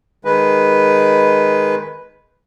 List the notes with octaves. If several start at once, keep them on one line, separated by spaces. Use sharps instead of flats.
D#3 G#3 B4